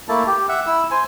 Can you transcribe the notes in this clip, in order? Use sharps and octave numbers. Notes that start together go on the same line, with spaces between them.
A3 A#3 E4 A5
G4
E5 F#5
E4 E6
C5 G#5